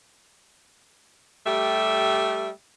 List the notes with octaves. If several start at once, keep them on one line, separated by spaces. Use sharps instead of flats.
G3 A3 G4 E5